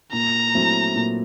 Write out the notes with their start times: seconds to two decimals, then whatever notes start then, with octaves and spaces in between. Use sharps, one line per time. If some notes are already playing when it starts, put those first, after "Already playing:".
0.13 A#2 A#5
0.54 F#3 A3 C4 E4
0.96 A#2